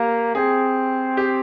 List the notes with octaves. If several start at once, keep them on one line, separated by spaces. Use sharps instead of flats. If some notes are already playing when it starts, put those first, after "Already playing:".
Already playing: A#3 G4
C4 G#4
G4